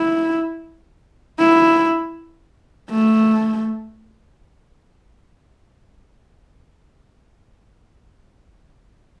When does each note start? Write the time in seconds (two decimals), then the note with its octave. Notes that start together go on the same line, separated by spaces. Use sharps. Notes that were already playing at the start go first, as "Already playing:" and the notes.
Already playing: E4
1.39 E4
2.90 A3